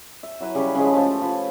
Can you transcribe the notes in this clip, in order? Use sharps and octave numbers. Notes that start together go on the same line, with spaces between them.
E5
F#3 E4 B4
C#3 G3 G4 C#5
C#3 F3 G#3
A3 A4 C5
F4 B4 C#5